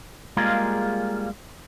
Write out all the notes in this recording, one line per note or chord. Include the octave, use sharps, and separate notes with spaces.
G3 G#3 A#3 F4 G#4 A#4